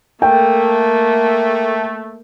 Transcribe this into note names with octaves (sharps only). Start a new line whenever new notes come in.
A3 A#3 G5